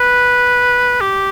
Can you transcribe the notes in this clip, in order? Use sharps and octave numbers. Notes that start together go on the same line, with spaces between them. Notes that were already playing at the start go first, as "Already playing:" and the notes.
Already playing: B4
G4